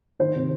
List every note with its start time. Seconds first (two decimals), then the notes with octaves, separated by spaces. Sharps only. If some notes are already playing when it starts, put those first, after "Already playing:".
0.19 D#3 C5
0.35 C3